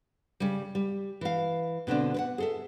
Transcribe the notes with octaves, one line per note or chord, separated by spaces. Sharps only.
C#3 G3
G3
E3 F5
B2 D3 C4 D4
B4 F#5
G#4 A4 E5